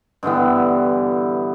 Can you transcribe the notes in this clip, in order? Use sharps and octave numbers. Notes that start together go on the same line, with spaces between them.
G2 D3 E3 B3